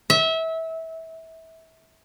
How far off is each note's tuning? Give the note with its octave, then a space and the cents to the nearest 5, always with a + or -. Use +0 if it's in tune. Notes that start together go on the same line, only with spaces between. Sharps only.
E5 -25